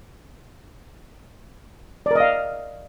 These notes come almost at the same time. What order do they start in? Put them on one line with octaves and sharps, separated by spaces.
D5 A#4 D#5 F5